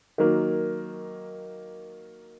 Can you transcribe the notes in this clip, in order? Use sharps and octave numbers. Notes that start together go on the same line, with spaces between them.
D#3 F#3 A#3